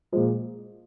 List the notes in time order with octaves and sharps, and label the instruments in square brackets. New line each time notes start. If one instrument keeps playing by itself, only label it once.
[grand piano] A#2 F3 G#3